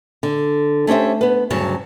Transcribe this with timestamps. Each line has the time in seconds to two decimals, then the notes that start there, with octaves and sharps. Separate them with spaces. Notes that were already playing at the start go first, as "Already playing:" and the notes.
0.23 D3
0.87 A3 C#4 G4 C5 E5
1.21 B3 B4
1.50 D2 G2 C#3 F#3 A5